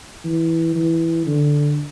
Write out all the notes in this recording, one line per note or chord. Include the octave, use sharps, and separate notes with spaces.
E3
E3
D3